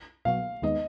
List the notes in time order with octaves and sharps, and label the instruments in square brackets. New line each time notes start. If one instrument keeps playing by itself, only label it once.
[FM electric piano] B2 F#3 B3 F#4 [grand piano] F5
[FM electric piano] D#2 D#3 G#3 B3 D#4 [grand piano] D#5